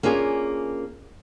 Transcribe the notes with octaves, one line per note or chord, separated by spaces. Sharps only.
A#3 C#4 D4 F4 G#4